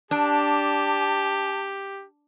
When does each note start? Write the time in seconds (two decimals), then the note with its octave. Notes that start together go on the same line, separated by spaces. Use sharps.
0.11 D4 G4 A5